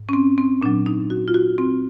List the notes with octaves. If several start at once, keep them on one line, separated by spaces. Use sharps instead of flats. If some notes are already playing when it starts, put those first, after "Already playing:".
Already playing: G#2
C#4
C4
C4
A#2 F#3 D4
D#4
F#4
F4
F#4
C4